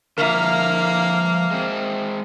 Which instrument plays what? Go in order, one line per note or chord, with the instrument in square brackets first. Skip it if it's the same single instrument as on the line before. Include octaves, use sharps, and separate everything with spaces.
[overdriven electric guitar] D3 F3 [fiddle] A#3 [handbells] A#4 E5 [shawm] F5
[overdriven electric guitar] G#3 C4